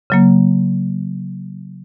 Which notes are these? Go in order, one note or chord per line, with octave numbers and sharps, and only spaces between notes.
C#3 F#3 A#3